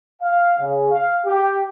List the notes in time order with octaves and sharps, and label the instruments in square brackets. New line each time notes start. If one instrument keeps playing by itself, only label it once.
[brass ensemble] F5
C#3
F5
G4